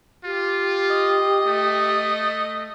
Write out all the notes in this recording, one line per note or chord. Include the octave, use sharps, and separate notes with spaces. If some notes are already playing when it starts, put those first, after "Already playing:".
F4 G4
D#5
A3